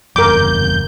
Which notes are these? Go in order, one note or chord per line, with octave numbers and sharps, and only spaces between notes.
F#1 E2 G2 A#4 D6 G6